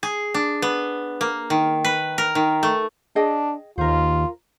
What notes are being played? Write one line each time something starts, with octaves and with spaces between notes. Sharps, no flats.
G#4
D4
B3
A#3
D#3
B4
A#4
D#3
A3
D4 G#4 D#5 G5
D#2 F4 A#4 C5